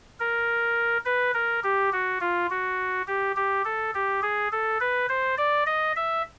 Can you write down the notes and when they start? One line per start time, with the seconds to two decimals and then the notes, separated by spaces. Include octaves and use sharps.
0.20 A#4
1.05 B4
1.34 A#4
1.64 G4
1.93 F#4
2.21 F4
2.50 F#4
3.07 G4
3.36 G4
3.65 A4
3.94 G4
4.22 G#4
4.52 A4
4.80 B4
5.09 C5
5.38 D5
5.66 D#5
5.96 E5